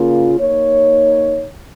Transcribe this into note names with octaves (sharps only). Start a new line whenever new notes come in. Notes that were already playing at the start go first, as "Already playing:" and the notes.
Already playing: C#3 A#3 F4
A#3 D#4 C#5